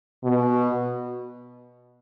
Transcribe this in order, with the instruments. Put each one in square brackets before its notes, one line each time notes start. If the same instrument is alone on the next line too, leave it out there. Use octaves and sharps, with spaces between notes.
[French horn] B2